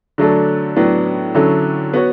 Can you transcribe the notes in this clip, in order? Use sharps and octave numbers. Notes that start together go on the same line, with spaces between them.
D3 F#3 A3 D4 A4
A2 F#3 B3 D4
D3 F#3 C#4 E4 A4
B3 F#4 C#5